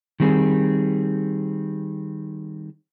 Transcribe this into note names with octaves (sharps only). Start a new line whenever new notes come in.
D#3 G3 C4 G#4